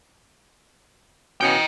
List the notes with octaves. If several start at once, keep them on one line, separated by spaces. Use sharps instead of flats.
B2 B3 C#4 D#5 G5